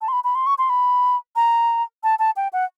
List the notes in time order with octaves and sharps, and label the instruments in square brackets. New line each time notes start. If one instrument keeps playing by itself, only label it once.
[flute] A5
C6
B5
B5
C6
C#6
C6
B5
A#5
A5
A5
G5
F#5